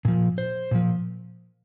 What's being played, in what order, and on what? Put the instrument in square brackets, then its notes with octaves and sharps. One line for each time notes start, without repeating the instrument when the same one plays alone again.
[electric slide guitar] A#2 F3
C5
A#2 F3